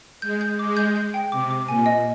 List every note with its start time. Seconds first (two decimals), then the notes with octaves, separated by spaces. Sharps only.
0.22 G#3 G6
0.41 G6
0.59 G#3 D6
0.77 G6
0.96 G6
1.14 G5
1.32 C3 D6
1.51 D6
1.68 A#2 G#5
1.86 D#5